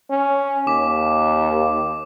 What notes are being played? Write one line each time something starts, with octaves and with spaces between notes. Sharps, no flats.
C#4
D#2 D6